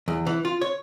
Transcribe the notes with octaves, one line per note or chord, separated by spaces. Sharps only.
E2
E3
F4
C#5